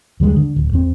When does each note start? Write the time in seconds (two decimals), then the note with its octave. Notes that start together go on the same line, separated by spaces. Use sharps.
0.20 D#2 D3 G3 G#3
0.36 D3
0.56 D1
0.73 E2 C4